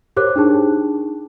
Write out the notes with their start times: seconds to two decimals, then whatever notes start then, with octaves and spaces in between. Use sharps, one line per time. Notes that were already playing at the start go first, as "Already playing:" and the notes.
0.17 G4 A#4 C5 C#5 D6 F#6
0.36 D4 D#4 G#4 A5